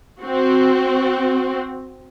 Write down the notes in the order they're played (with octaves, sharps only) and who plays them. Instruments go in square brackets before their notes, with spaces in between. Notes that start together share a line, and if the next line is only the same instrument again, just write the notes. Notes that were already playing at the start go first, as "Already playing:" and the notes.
[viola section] C4 F#4